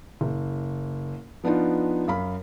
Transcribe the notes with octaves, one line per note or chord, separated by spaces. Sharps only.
F#1
F3 B3 D4 D#4 F4
F#2 F5 B5